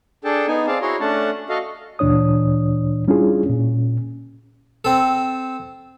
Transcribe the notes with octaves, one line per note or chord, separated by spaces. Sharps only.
D4 G#4 A4 G5 A5
B3 D#4 G#5
C4 G#4 D5 F5 A5
E4 F#4 G#4 C#5 A#5 C6
A3 C#4 D4 F#5 A5
F#4 A4 D#5 F5
D2 A#2 E3 D4 C#5 D#6
G3 C#4 D4 E4 F4 G#4
A#2 C#4
C4 A4